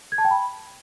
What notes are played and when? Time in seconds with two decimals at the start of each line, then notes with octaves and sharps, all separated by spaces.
0.12 G#6
0.18 A5
0.25 G5
0.31 B5